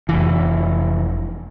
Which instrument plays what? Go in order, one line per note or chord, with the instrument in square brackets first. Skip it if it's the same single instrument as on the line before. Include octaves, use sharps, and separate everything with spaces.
[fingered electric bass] F1 E3